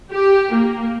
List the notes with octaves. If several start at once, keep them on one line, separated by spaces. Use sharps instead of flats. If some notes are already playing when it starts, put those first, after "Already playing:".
G4
A#3